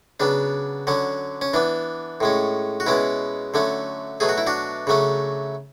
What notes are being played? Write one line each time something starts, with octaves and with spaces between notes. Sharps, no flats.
C#3 F#3 B3 D4
D3 F#3 C#4
C#4
E3 B3 D4
A2 G#3 C#4
F#4
B2 G#3 B3 C#4 E4
D3 F#3 A3 C#4
B2 F#3 A3 G#4
F#4
E4
D4 F#4
C#3 F#3 A3 C#4